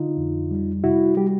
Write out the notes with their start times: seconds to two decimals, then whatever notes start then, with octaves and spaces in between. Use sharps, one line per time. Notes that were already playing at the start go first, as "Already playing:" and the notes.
Already playing: D3 D#4 F4
0.17 F2
0.51 G3
0.84 C3 E4 F#4
1.17 G3 G4